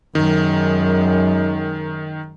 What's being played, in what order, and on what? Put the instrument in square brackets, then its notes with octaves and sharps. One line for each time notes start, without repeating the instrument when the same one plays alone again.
[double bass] F#2 G#3 [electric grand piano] D#3